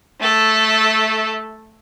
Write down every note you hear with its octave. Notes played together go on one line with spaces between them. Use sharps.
A3 A4